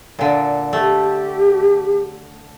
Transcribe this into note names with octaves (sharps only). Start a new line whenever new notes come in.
A#2 D3
A3 G4